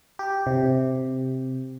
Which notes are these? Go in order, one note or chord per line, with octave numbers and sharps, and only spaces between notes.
G4
C3